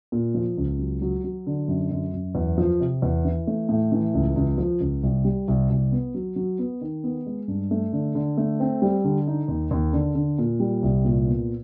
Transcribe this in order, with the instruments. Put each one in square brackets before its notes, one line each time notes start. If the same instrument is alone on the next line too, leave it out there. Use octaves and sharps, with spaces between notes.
[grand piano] A#2
F3
C#2
F#3
F#3
F#3
D3
F#2
F#2
F#2
E2
F3
C3
E2
E3
A3
A2
E3
C#2
C#2
F3
C#2
C2
G3
C2
C2
B3
F#3
F#3
B3
D#3
B3
G#3
G2
A3
D3
D3
A3
C4
G3
D3
D#4
D#2
D#2
D3
D3
A#2
G3
C2
A#2
B3